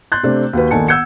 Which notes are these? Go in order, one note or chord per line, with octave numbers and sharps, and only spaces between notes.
C6 F#6 G6 A6
C3 A3 C4 D4
D#2 F#4 B4
A#1 D#3 A4 G#5 A5 C#7
F#5 E6 G6 G#6 C#7